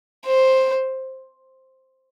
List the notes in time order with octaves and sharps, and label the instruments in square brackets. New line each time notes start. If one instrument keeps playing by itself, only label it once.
[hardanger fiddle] C5